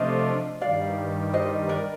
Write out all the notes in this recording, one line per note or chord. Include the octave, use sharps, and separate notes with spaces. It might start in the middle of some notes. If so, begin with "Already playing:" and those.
Already playing: C3 F3 A3 D4 F4 C5 D#5
G2 D#3 G3 D5 F5
C5 D#5
A#4 D5